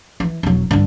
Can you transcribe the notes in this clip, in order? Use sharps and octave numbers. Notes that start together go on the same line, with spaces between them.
E3
E1 F#3
G2 D3